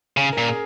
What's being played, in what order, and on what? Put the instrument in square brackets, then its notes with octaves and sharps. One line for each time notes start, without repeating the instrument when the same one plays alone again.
[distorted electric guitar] C#3 [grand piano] C#4
[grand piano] A#4
[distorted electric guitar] A#2
[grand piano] G#4